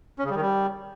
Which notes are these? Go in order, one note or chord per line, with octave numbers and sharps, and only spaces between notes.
C#4
C#3
G3
D#3
G3